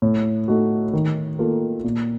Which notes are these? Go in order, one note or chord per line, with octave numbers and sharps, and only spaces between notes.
A2
A3 D#4 F#4
D#3
A#3 F4 A4
A#2